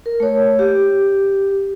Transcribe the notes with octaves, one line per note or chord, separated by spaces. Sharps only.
A#4
A3 C#5
G4